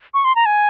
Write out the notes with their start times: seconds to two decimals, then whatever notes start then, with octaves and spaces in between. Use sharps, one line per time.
0.14 C#6
0.24 C6
0.35 A#5
0.46 G#5